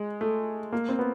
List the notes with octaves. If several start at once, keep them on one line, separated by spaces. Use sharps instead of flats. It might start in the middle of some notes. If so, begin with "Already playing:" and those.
Already playing: G#3
A3
A#3
C4
B3